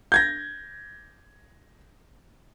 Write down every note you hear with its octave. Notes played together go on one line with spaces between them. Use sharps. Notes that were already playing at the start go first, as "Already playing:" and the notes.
G6 G#6 A#6